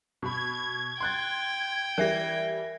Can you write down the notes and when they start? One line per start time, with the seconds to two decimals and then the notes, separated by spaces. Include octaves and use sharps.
0.22 B2 B5 G#6
1.01 G5 C6 F#6 A6
1.98 E3 G3 A#4 E5 A#6